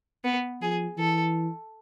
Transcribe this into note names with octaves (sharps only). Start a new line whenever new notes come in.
B3
F3 G#4
E3 A4